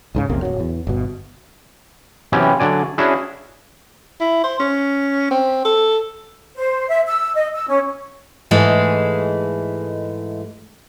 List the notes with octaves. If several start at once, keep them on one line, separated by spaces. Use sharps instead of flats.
C#2 G#2 C#3
A#1 E2 C3 A#3
D1 F#3
E2
G1 B2
C3 E3 F#3 B3 C#4 G4
D3 F#3 D5 G#5
C#4 D4 E4 F#4 G#4
E4
C5
C#4
C4
A4
C5
E5
E6
D#5
E6
C#4
G#2 E3 G#3 A3